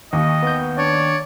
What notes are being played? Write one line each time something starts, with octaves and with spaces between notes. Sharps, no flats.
D#2 D#5
B3 G6
D4 C#5 D5